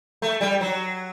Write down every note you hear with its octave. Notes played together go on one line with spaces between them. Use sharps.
A3
G3
F#3